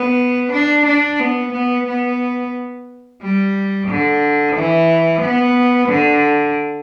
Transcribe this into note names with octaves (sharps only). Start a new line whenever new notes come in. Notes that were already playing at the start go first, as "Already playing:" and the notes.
Already playing: B3
D4
D4
B3
B3
B3
G3
D3
E3
B3
D3